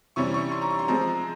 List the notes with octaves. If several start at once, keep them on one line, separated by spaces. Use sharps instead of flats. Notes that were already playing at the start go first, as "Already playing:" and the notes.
C3 E3 G3 C#4 C#6
C#6
C6
A#5
C#6
C6
F3 G#3 C4 A#5